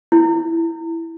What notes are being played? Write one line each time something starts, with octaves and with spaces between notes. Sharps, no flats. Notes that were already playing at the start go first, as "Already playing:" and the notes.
E4